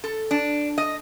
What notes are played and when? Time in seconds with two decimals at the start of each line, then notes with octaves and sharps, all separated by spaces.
0.04 A4
0.31 D4
0.78 D#5